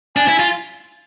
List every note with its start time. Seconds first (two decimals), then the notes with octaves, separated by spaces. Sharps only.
0.16 D4 G#5
0.28 E4
0.39 F4